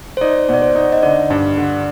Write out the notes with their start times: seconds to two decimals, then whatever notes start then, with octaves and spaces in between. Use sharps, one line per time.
0.17 C5
0.21 D#4 D5
0.49 B2 D5
0.62 C5
0.76 D#4
0.92 D#5
1.03 D3 D5
1.30 G2
1.57 D3